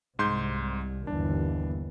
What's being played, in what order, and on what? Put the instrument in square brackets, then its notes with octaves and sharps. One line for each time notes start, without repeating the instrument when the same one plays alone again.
[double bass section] C2 [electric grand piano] G#2 C6 G6
[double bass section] G1 D#2 E3 [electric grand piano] D4